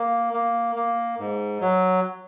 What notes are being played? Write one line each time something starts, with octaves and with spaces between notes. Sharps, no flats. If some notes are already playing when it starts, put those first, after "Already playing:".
Already playing: A#3
A#3
A#3
G#2
F#3